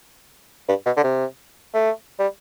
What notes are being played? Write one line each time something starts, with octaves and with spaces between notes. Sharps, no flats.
G2
B2
D3
C3
A3
G3